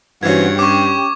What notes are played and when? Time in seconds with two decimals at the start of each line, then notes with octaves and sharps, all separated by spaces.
0.23 G2 E3 C4 C#4 F#4 C#5 G#6
0.59 C#4 G4 C#6 D6